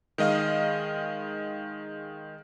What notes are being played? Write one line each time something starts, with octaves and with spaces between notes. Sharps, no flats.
D#3 G#3 D#5 F5 F6